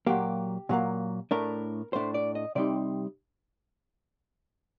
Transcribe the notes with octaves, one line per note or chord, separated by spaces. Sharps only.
A#2 F#3 A#3 G4
A#2 F#3 A#3
A2 A3 D4 A#4
A2 A3 D4 C5
D5
D#5
C3 G3 C4 D#4 D5